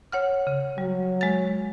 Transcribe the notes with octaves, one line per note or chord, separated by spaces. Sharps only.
C#5 F#5 F6
C#3
F#3 G3
G#3 A6